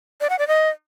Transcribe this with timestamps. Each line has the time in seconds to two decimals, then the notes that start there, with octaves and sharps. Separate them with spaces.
0.21 D5
0.30 F#5
0.39 D5
0.48 D#5